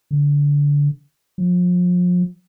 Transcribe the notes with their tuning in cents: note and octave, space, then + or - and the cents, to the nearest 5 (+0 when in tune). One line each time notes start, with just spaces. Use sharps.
D3 -25
F3 +35